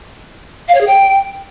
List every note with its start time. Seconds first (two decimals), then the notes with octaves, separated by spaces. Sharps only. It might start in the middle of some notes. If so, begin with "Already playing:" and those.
0.68 F5
0.74 C#5
0.81 G#4
0.87 G5